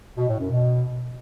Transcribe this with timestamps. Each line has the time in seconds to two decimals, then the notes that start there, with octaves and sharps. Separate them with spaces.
0.17 B2
0.28 A2
0.39 F#2
0.50 B2